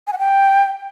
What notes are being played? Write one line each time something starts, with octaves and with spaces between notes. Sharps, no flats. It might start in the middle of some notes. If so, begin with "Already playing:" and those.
G#5
F#5
G5